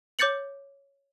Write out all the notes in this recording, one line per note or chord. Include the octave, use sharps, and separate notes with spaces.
C#5 D6 G6 A6 C#7 F#7